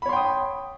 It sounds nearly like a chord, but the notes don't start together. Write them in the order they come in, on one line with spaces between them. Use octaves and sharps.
B5 C#5 C6 G5 D#6